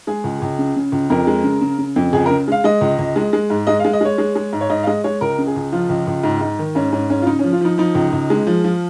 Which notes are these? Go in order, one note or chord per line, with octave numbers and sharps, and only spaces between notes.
G#3 G#4
C#2
C#2
C#3
C#3
C#2
F2 A#4
G#3
C#3
C#3
C#3
F2
C#2 G#4
A#4
C#3
G#3 F5
G#3 D#5
C#2
C#2
G#3
G#3
G#2
G#3 D#5
F5
G#3
D#5
G#3 C#5
G#3
G#3
G#2
C#5
G#2 D#5
F5
G#3 D#5
G#3 C#5
C#2 A#4
C#3
G#4
C#2
F3 F4
C#2
C#2
G#2
G#2
D#3
G#2 C#4
G#2 C#4
G#2 C#4
F4
C#3 D#4
C#4
F3
F4
F3 D#4
F3 D#4
C#2
C#2
G#3
F3
F3